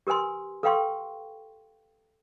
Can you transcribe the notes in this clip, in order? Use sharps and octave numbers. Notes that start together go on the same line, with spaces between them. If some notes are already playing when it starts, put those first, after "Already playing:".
G4 A#4 B4 G#5 C6
A4 B4 F5 G5 C6 C#6